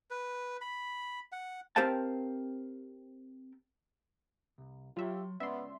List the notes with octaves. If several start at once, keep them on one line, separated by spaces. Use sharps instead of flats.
B4
B5
F#5
C4 G4 A#4 C5 F5 A5
C2
F#3 F4 G4 C#5 E5 C6
G#3 B3 C#4 D5 E5 C6